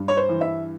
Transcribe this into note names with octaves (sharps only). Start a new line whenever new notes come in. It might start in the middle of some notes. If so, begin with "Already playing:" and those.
Already playing: G2
C#5
C5
E3
E5